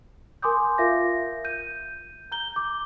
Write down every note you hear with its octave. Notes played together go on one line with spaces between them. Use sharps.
A#4 G#5 C6 D6 D#6 G6
F4 A#4 E5 F5 A#6
G6 D#7
A#5 G6 G7
D6